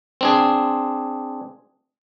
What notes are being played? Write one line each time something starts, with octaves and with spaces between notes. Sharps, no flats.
C4 D4 G#4